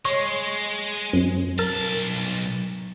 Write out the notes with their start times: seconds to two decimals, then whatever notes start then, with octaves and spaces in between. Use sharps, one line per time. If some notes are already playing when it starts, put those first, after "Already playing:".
0.05 G#3 C#5
1.13 F#2
1.59 B1 A#4 A5